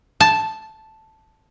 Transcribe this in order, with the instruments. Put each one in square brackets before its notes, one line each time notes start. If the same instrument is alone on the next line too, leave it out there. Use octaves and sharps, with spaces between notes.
[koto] A5